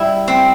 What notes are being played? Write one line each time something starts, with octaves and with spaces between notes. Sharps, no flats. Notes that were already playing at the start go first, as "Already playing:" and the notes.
Already playing: G3 E4
C4